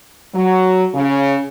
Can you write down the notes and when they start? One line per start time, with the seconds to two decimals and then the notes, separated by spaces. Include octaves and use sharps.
0.34 F#3
0.94 C#3